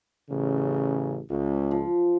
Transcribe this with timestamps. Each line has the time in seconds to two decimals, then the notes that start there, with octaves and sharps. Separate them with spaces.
0.30 A1 C#3
1.30 C#2
1.71 F3